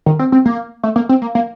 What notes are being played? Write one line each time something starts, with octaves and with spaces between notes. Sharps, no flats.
D#3
C4
C4
A#3
A3
A#3
C4
A#3
A#3